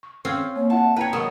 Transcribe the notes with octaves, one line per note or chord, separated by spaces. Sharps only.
C#6
C4 C#4 F4
A#3 C#5
E4 F4 E5 F#5 A5
E4 B4 C#5 G5 A#5
D#3 E3 F#3 G#3 A#4 D#6